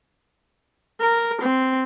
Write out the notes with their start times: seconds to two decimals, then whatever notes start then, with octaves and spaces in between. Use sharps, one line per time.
1.01 A#4
1.41 C4